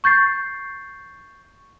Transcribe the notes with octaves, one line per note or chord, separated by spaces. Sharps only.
C#6 G6 A6 C7